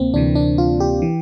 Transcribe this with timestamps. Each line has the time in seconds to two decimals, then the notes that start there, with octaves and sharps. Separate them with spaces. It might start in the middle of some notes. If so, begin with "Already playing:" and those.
Already playing: D2 C3 A#3 C4
0.14 D2 C3 E3 D4
0.35 D4
0.58 F4
0.80 G4
1.02 E3